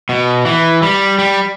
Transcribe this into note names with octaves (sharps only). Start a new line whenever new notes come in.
B2
E3
G3
G3